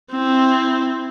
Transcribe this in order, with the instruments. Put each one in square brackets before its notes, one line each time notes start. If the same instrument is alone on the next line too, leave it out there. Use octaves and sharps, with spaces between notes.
[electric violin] C4 E4